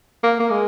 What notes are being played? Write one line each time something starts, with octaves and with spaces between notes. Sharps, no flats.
A#3
A#3
G#3